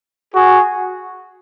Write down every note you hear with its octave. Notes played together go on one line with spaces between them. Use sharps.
F#4 G#4